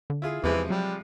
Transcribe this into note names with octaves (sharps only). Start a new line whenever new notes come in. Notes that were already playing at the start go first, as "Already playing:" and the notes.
D3
E4 F4 G#4
E2 C3 E3 F3 G#3
F#3 G3